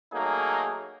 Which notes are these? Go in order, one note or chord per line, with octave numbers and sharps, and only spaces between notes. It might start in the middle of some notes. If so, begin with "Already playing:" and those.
F#3 A3 A#3 D#4 G#4